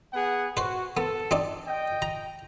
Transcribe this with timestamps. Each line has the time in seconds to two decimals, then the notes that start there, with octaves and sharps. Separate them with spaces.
0.13 B3 G#4 F#5
0.57 F#4 B4 C5
0.97 B3 A4
1.31 C4 D#4 D5
1.66 D#5 G5
2.02 A#5